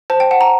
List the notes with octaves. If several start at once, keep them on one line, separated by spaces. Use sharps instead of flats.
C5 A5
G5
F#5 A5
A#5